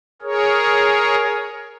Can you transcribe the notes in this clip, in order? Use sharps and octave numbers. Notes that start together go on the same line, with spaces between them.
G#4 A#4 C#5